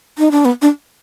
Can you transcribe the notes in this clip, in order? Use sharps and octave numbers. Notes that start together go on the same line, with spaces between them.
D#4
D4
B3
D4